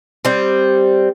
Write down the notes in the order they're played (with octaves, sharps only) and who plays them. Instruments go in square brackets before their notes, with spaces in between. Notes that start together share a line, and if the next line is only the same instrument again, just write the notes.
[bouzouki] G3 C4